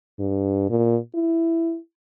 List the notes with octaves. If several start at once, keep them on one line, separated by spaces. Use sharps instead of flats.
G2
A#2
E4